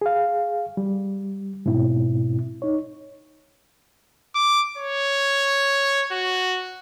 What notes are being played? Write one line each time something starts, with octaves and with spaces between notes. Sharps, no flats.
G#4 F5
G3
G#2 B2 C4 E4
D#4 C#5
D6
C#5
F#4